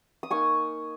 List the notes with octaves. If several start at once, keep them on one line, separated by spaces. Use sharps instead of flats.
D#6
A#3 D#4 G#5 C#6